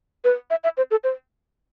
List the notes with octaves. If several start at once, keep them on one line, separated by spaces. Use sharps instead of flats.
B4
E5
E5
C5
A4
C5